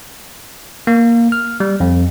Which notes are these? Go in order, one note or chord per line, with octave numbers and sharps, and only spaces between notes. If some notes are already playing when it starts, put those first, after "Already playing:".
A#3
F6
G3
F2